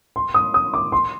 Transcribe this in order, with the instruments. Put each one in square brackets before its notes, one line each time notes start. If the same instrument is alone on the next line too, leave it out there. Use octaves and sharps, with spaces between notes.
[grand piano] C6
D#6
D#6
D6
C6